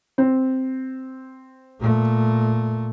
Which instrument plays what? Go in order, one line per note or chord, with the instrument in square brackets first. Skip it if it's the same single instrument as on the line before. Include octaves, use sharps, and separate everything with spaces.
[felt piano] C4
[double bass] A#2 A3